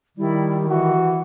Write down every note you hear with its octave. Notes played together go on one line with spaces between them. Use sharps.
D#3 G3 E4 D5
E3 F#4 F#5